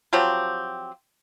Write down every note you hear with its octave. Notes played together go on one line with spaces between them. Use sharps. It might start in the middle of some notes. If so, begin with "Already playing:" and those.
F3 F#3 C4 G4